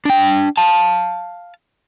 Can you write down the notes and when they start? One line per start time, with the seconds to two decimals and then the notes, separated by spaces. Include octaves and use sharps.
0.05 D4 G5
0.57 F5 A5